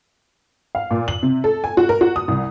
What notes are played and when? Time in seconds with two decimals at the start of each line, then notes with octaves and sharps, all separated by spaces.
0.75 F5
0.91 A#2
1.08 F#7
1.23 C3
1.44 A4
1.64 G#5
1.77 F#4
1.89 A#4
2.01 F#4
2.16 D#6
2.28 C2